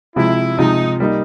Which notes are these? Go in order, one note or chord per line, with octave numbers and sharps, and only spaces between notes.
C3 F3 G#3 E4
C3 F3 G#3 D#4
G3 A#3 D#4